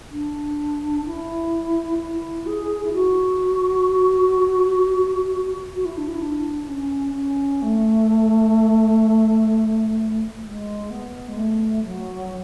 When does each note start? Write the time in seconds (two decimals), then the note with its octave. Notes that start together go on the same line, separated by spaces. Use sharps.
0.11 D4
1.06 E4
1.99 E4
2.46 G#4
2.83 E4
2.94 F#4
5.75 F#4
5.85 E4
5.97 D4
6.08 E4
6.22 D4
6.68 C#4
7.15 C#4
7.62 A3
10.43 G#3
10.91 B3
11.28 G#3
11.37 A3
11.84 F#3